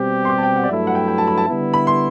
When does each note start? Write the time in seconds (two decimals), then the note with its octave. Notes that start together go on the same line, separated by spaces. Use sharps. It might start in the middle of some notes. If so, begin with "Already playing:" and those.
Already playing: B2 G3 C4 G4
0.25 C6
0.30 D6
0.38 A5
0.43 G5
0.56 F#5
0.63 D5
0.68 G2 F#3 A3 E4 E5
0.87 F#5
0.95 G5
1.08 G5
1.18 A5
1.27 B5
1.38 A5
1.48 D3 G3 B3 E4
1.74 B5
1.87 C6